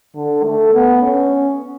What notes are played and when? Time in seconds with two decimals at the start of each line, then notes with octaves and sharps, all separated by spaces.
0.15 D3
0.44 A3
0.74 B3
1.02 C#4